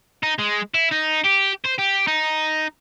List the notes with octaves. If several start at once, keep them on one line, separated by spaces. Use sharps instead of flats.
D#4
G#3
E4
D#4
G4
C5
G4
D#4